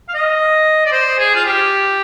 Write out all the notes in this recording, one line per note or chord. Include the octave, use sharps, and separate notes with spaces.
F5
D#5
D5
C5
G#4
F4
G4